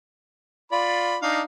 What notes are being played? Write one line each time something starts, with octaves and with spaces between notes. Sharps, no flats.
F4 D5 B5
D4 D#4 F5